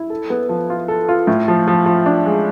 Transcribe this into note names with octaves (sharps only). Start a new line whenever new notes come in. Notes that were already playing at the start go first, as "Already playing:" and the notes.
Already playing: E4
A4
B3
F3
F4
A4
F4
A2
F3
F3
F3
D4
G#3